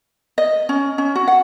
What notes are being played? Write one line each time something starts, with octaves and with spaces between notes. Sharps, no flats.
D#5
C#4
C#4
F#4
F#5